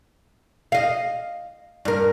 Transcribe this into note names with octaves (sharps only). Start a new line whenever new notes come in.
D#5 F5
G2 A#4